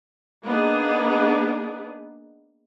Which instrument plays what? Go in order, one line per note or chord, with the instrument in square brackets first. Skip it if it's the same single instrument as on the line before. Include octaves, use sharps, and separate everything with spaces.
[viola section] A#3 B3 D4 D#4 G#4